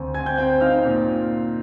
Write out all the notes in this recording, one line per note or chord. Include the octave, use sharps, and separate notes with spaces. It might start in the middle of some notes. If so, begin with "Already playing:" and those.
Already playing: D2 C4 G#5
C4 G#5 G#6
G5 G6
C4 G5 G6
D#4 F5 F6
A#2